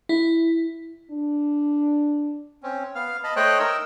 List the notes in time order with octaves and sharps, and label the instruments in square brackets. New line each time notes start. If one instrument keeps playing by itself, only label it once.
[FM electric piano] E4
[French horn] D4
[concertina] C4 C#4
B3 F5 F6
D#5 A5 B5
A3 C5 C#5 D#5 G5 F#6
D#4 A#4 D#5 E6